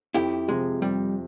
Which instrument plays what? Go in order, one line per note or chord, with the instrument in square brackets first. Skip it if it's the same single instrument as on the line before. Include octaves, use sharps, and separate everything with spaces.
[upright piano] F2 [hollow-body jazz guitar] E4 G4
[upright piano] C3 F3 [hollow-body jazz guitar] G#3
[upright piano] F2 [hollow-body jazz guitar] G3